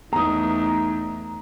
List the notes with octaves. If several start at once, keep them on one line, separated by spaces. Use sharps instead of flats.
E2 A3 D#4 A#5 D#6